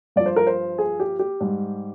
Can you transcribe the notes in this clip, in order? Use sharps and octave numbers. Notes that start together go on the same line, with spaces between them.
G2 F3 D5
C5
A#4
C5
G#4
G4
G4
G#2 G3